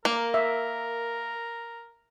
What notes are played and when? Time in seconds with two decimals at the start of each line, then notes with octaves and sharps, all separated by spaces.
0.05 A#3 A#4
0.34 E5